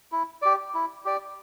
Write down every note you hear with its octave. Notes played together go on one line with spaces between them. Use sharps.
E4
G4 D5
E4
G4 D5